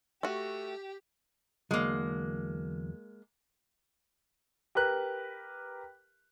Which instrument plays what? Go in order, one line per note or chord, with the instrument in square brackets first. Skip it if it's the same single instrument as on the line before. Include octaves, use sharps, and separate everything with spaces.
[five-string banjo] A3 F#4 [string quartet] G4
[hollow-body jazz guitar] E2 D3 F#3 [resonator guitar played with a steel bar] G#3 A#3
[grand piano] G4 A#4 B4 F#6